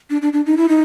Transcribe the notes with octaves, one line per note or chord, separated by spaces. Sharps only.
D4
D4
D4
D#4
E4
D#4